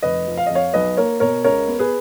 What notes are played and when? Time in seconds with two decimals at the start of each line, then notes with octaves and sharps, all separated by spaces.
0.02 F1 B4 D#5
0.27 F3
0.37 F5
0.47 F2 D#5
0.55 C#5 F5
0.73 B1 B4 D#5
0.97 A#3 A#4 C#5
1.20 B2 A#4 C#5
1.44 C#2 A#4 C#5
1.67 B3
1.79 G#4 B4